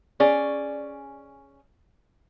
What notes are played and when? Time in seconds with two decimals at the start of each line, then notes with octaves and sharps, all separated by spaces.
0.20 C#4 G#4 D5